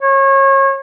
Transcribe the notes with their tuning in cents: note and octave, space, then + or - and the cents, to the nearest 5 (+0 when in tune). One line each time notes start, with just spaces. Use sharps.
C#5 -30